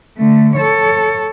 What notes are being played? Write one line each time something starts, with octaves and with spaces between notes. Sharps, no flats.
D3 A3
A4 C#5